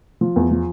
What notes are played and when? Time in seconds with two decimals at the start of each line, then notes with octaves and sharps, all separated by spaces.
0.21 F3
0.36 E2
0.51 F3